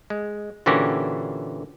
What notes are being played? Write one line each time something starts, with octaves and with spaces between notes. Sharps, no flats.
G#3
A#2 D3 E3 C#4 F#4 G4